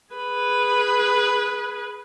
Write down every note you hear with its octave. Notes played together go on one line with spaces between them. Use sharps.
G#4 B4